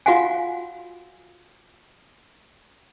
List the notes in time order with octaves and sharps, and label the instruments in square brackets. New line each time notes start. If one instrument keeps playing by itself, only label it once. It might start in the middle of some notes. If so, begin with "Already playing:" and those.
[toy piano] F4 F#4 F5 F#5 G#5